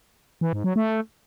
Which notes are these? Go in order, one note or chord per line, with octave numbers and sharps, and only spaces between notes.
E3
G#2
F#3
A3